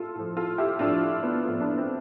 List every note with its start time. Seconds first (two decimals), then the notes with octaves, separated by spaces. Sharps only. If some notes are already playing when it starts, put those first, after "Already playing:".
Already playing: A2 F4 A4
0.15 A2 F3
0.37 F4 A4
0.58 E4 G4
0.79 A2 F3 D4 F4
1.23 B3
1.45 F3 B3
1.48 A2
1.60 B3 D4
1.77 C4 E4